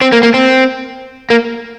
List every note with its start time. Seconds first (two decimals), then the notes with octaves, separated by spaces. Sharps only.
0.01 C4
0.12 A#3
0.23 A#3
0.34 C4
1.30 A#3